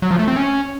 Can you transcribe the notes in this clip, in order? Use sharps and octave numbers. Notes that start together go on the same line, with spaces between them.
F#3
F3
A3
C4
C#4